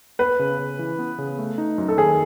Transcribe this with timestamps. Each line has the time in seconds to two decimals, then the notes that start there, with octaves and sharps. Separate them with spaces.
0.19 B3 B4
0.39 C#3
0.59 C#3
0.79 E3
0.99 B3
1.18 C#3
1.39 A3
1.58 D#4
1.78 F#2
1.88 A4
1.97 D#3 G#4